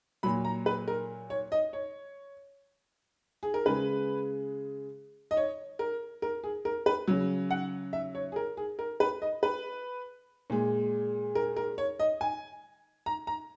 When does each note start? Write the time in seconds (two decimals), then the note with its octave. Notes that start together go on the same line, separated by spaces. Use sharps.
0.23 A#2 F#3 B5
0.45 A#5
0.66 B4
0.88 A#4
1.30 C#5
1.52 D#5
1.73 C#5
3.43 G#4
3.54 A#4
3.66 C#3 G#3 B4
5.31 D#5
5.37 C#5
5.79 A#4
6.22 A#4
6.44 G#4
6.65 A#4
6.86 B4
7.08 C#3 F#3
7.51 F#5
7.93 E5
8.15 C#5
8.32 G#4
8.36 A#4
8.57 G#4
8.79 A#4
9.00 B4
9.22 D#5
9.43 B4
10.50 A#2 G#3
11.35 A#4
11.56 A#4
11.78 C#5
11.99 D#5
12.21 G#5
13.06 A#5
13.27 A#5